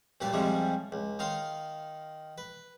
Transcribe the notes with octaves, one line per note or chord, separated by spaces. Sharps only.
G2 A#2 F#3 G4 D5
F2 C3 F3 G3 G#3 C#4
C#2
D#3 D#4 F5 C6
B4